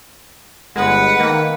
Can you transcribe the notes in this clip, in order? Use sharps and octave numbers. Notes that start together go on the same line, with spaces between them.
G1 G#3 B4 F#5
D#3 A#3